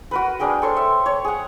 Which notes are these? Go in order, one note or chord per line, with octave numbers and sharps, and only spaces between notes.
F#4 A#4 B4
D4 G#4 A#4 G5
A4 C5 C#5 C6
E5
C#5
G#4 F#5